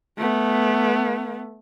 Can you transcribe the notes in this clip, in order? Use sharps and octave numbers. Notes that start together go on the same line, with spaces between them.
A3 B3